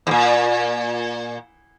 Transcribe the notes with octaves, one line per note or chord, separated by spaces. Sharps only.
E2 A#2